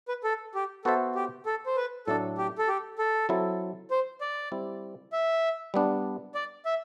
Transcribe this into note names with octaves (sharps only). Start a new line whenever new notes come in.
B4
A4
G4
B3 F#4 A4 C5 E5
G4
A4
C5
B4
A2 F#3 A3 D4 A4
G4
A4
G4
A4
F#3 C4 E4 A4
C5
D5
G3 C4 E4
E5
G3 B3 D4
D5
E5